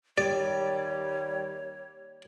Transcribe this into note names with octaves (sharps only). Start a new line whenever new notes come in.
D#2 G3 G4 C#5 D5